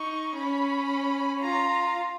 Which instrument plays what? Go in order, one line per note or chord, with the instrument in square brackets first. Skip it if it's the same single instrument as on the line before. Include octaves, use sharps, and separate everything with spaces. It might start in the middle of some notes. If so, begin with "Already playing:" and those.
Already playing: [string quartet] D#4 [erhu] C#6
[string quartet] C#4 [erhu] B5
[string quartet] F4 [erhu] A#5